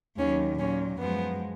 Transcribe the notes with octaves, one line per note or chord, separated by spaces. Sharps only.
D#2 D#3 F#3 C#4
A#2 F#3 C#4
F#2 F3 G#3 B3